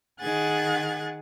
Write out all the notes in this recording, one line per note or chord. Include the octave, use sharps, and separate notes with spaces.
D#3 G#4 F#5 F#6 G#6 A6